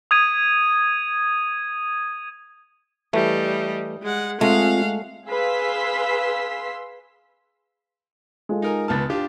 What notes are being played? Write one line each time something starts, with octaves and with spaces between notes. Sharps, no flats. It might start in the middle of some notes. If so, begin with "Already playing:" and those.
D#6 G#6 D#7
E3 G3 A3 D#5
G#3 F#5
G#3 A3 C4 F4 F5 F#5
G#4 B4 F5 C6 E6 B6
G#3 F4 A4
D#4 A#4 G#5
C#2 B3 A5 F6 A6
D4 F4 G4